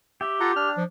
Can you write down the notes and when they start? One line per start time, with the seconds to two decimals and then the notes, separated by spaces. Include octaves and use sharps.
0.21 G4 E5
0.40 F4 A4 F#5 A#5
0.56 D4 F6
0.77 F3